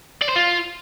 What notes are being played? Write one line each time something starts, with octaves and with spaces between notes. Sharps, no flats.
D5
C5
F4